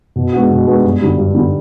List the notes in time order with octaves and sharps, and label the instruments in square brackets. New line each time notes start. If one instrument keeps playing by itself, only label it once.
[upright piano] B2
G#3 B3 D4 F#4
B2
G#3 B3 D4 F#4
G2
D3 G3
G2
D3 G3